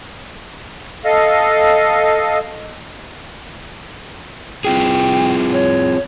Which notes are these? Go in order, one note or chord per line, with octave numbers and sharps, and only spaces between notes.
A4 D#5 F5
C4 F4 G#4 G5
C#5